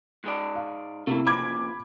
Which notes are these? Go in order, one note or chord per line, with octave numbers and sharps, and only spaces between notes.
G#2 G#3 D5
F5
C3 A3 A#3 E4
A#2 C#3 F3 B5 D6 G#6